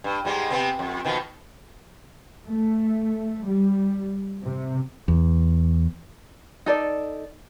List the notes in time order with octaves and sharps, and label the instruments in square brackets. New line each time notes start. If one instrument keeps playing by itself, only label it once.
[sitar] G2
G#2 G3 G#3
C3 B3 C4
F2
B2 D#3 F3
[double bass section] A3
G3
C3
[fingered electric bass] E2
[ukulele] D#4 A4 D5